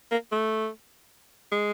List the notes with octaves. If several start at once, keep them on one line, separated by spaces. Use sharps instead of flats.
A#3
A3
G#3